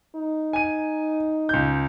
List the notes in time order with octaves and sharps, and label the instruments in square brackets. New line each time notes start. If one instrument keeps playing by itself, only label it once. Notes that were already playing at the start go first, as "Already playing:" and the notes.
[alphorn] D#4
[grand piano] G#5 D#7
C#2 G6